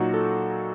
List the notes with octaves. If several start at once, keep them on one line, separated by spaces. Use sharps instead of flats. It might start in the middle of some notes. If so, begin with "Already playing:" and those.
Already playing: A#2 F#3 D#4 F#4
A4